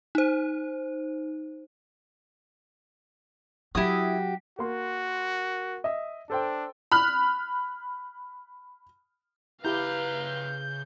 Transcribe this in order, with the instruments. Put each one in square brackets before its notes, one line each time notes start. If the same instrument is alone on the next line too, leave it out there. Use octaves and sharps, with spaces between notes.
[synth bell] D#4 C5
[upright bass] F#3 C#4 [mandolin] E4 D#6 [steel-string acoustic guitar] F#4 G4
[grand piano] A#3 C6 [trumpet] F#4
[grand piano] D#5 E5
[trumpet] D4 [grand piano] A4 C5 G5
[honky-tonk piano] B5 F6 F#6
[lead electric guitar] C#3 A#5 [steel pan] E4 G4 [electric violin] B4 F5 [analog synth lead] G6